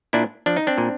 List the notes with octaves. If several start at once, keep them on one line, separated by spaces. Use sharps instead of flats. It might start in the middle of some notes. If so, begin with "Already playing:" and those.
A#2 D4 E4
F3 D4
D#4
C4 D4
A#2